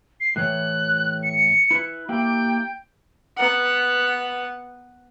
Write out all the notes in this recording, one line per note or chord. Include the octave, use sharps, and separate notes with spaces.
C7
A2 E3 C#5 F#6
C#7
E4 B4
A#3 E4 G4 G5
B3 F#5